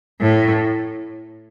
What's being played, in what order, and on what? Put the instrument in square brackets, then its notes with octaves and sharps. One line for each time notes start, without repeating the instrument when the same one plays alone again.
[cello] A2